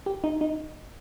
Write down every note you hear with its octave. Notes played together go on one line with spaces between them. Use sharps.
G4
D#4
D#4